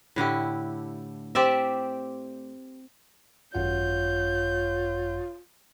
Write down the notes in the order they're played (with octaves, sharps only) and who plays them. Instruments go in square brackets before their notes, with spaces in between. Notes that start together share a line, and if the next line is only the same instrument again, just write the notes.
[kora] A2 D3 E4 G4
C4 G4 D5 E5
[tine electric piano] G#1 F#2 F#5 [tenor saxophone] F4 [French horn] C#5 [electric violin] G6